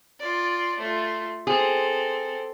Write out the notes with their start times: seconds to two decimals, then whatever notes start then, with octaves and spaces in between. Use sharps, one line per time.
0.20 F4 D5
0.79 A3 F4
1.47 C4 G#4 A4